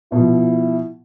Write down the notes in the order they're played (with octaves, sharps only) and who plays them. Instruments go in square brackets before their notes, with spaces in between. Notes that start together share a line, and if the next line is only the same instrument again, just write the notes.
[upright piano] B2 F3 [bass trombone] E4